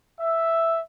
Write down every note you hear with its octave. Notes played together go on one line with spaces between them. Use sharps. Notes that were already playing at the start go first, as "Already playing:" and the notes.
E5